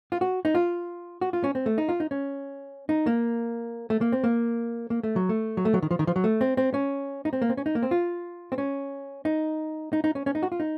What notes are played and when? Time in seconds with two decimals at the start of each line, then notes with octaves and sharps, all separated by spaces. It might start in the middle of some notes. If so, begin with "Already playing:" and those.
0.12 F4
0.21 F#4
0.45 D#4
0.55 F4
1.21 F#4
1.33 F4
1.44 C#4
1.55 C4
1.66 A3
1.78 D#4
1.89 F4
2.00 D#4
2.11 C#4
2.89 D#4
3.06 A#3
3.90 A3
4.01 A#3
4.12 C4
4.24 A#3
4.90 A#3
5.03 A3
5.16 F#3
5.29 A3
5.57 F#3
5.65 A3
5.74 F#3
5.82 D#3
5.91 F3
5.99 D#3
6.07 F3
6.16 F#3
6.24 A3
6.41 C4
6.57 C4
6.74 C#4
7.25 D#4
7.33 C4
7.42 A#3
7.49 C4
7.57 C#4
7.66 D#4
7.75 A#3
7.83 C4
7.91 F4
8.52 C4
8.58 C#4
9.25 D#4
9.93 D#4
10.04 D#4
10.15 C#4
10.26 C#4
10.35 D#4
10.43 F#4
10.52 F4
10.60 D#4